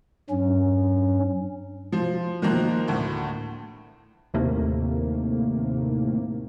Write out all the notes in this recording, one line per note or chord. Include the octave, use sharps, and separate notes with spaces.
G2 F#3 C#4
F3
D#3 F3 A#3 A#5 F#6
D2 A2 A3
D#2 A2 C3 A3 A#3